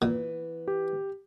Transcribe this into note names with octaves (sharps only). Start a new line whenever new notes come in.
A#2 E3 B3
G4